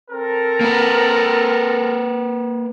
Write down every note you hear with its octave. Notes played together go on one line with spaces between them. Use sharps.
C4 A4 A#4
A#3 B4